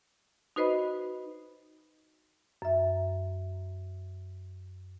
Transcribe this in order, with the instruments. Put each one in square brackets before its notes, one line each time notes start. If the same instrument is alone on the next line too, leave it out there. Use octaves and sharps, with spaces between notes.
[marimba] D#4 F#4 B4 C5 D#5 B5
F#2 E5